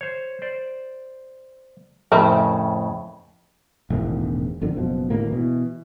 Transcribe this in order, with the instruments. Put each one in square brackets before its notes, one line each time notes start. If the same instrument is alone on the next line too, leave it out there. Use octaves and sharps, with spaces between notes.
[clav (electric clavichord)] C5 C#5
C5 D5
[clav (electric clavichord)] F2 A2 C#3 [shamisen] A#4 C5 E5
[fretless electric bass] E1 A1 G#2 D#3
G#1 F2 D3 D#3
F#1 B2 F3
G#1 D2 A2 A#3
B2 E3